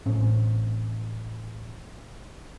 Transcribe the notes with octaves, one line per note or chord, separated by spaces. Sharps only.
A1 A2 C4 C#4